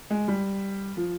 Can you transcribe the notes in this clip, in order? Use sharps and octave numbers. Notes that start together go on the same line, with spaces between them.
G#3
G3
F3